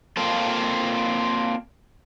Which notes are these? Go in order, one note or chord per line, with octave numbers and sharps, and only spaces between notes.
A#3 C4 F4 A4